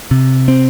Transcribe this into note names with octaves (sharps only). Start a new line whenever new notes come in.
C3
C4